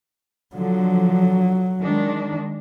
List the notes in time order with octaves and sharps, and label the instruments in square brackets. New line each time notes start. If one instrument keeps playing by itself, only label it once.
[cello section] D3 F3 [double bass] F#3
[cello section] D#3 G#3 D4